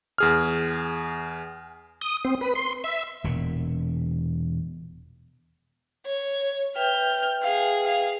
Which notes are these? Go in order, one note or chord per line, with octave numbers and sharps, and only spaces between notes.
E2 G#4 F6
D#6
C4
B4
C6
E5
E1 A#2
C#5
B4 E5 G5 F6 G6
G#4 F5
F5